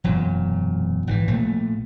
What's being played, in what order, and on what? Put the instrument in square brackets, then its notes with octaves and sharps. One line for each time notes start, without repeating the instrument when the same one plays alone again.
[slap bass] E1 F#2 A#2
G#1 B2 E3
A#1 A#2 A3